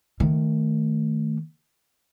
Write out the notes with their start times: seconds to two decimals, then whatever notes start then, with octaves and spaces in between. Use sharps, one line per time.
0.20 D#3 A3